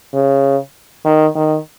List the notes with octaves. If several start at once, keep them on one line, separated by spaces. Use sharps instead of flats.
C#3
D#3
D#3